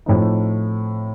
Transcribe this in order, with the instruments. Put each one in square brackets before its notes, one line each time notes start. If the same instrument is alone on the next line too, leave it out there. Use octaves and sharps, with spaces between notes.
[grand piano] A2 F3 A3 C4 D#4